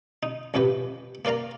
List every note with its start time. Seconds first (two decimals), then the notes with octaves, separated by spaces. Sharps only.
0.23 D#4
0.54 A1 F2 C3 G4 B4
1.25 A#3 A#4 D5 F5 A#5